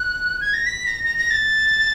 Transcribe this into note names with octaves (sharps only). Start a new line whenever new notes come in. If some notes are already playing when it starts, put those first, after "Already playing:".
Already playing: F#6
G#6
A#6
B6
A#6
A#6
A#6
A6